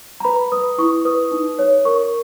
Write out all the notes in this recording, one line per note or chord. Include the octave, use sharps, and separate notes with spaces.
A#5
B4 B5
B4 D#6
E4 C#6
B4 D#6
D#4
C#5
A#4 C#6